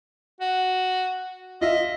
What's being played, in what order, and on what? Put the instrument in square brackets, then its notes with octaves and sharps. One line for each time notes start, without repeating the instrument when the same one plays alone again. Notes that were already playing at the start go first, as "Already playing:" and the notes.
[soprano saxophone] F#4
[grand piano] F4 E5 [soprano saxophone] D#5